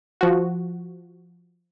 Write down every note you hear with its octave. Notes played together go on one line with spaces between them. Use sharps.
F3 F#4